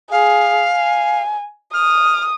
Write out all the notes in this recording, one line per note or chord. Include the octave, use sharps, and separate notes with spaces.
G#4 F5
G#5
D#6 F6